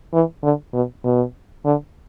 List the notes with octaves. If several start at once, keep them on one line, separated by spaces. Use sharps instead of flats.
E3
D3
B2
B2
D3